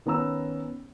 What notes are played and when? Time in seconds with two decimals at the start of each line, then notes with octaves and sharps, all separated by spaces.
0.06 D#3 B3 C#4 A#5 E6